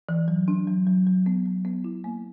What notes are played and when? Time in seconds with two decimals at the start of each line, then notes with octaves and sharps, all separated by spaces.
0.09 E3
0.28 F#3
0.48 D4
0.67 F#3
0.87 F#3
1.07 F#3
1.26 B3
1.46 F#3
1.65 B3
1.84 E4
2.04 A#3